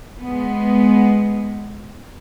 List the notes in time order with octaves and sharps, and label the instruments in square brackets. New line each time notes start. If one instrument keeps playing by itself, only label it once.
[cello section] G#3 B3